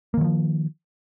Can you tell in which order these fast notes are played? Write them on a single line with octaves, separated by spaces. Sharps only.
A#3 D#3 F#3 F3